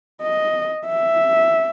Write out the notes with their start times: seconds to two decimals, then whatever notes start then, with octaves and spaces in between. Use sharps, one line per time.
0.22 D#5
0.87 E5